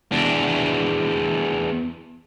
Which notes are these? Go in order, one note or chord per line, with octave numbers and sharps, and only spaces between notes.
E2 D4